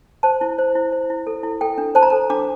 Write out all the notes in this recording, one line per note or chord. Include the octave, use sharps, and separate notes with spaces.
C5 A5
E4
C5
E4
C5
E4
A4
E4
A4 G5
D4
C5 A5
A#5
A4 A5
D4 D6